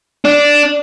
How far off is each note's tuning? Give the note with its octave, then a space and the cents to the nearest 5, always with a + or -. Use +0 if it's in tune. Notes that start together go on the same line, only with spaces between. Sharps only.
D4 -5